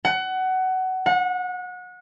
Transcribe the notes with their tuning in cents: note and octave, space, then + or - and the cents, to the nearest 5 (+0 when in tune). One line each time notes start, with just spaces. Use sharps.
F#5 +20
F#5 -30